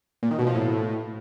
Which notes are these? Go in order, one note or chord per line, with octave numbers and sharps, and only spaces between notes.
A#2
D#3
B2
F3
A2